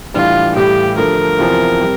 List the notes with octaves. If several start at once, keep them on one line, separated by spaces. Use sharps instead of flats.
A2 E3 G3 D4 F4
A2 E3 G3 G4
D3 F3 A3 A#4
E2 C3 F3 C4 E4
G3 C4 G4